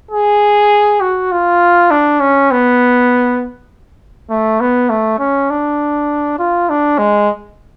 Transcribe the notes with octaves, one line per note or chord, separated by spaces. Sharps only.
G#4
F#4
F4
D4
C#4
B3
A3
B3
A3
C#4
D4
F4
D4
G#3